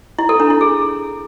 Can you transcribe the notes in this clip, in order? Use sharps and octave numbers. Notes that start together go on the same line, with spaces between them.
E4
A4
D4
E4
G#4